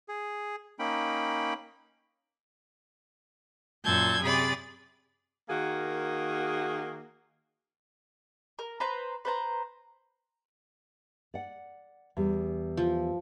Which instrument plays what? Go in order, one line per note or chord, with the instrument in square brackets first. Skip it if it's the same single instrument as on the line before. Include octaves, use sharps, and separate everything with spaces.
[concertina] G#4
A#3 C#4 D#4 G5 B5
[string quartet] F#2 A#2 A5 E6 G6 G#6
C3 G#4 D5 B5 A6
[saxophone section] D#3 A#3 F#4 G#4
[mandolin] A#4
B4 C5 A#5
B4 C5 A#5
[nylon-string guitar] D5 F#5
E2 G3
[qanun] F3